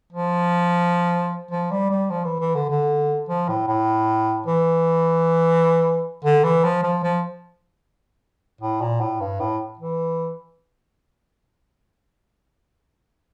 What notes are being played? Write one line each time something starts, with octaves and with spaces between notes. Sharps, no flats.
F3
F3
G3
G3
F3
E3
E3
D3
D3
F3
A2
A2
E3
D3
E3
F3
F3
F3
A2
A#2
A2
G2
A2
E3